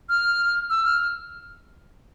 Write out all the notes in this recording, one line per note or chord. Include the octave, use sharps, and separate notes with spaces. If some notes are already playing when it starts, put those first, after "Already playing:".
F6
E6
F6